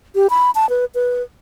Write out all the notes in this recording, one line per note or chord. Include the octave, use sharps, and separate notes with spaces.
G4
B5
A5
B4
B4